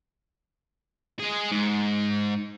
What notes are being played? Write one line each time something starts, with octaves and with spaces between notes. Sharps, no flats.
G#3 G#4
G#2